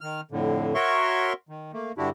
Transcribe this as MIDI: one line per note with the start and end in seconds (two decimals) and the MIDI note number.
0.01 0.21 51
0.01 0.21 89
0.31 0.74 41
0.31 0.74 45
0.31 0.74 50
0.74 1.33 66
0.74 1.33 70
0.74 1.33 73
0.74 1.33 76
0.74 1.33 84
0.74 1.33 85
1.49 1.72 51
1.73 1.92 57
1.73 1.92 58
1.98 2.10 43
1.98 2.10 50
1.98 2.10 62
1.98 2.10 64
1.98 2.10 66
1.98 2.10 67